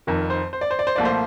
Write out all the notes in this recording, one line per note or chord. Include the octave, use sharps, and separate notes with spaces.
F1 F2 D#3 A#4
C5
C5
D5
C5
D5
C5
C2 A#2 F3 A3 D5
C5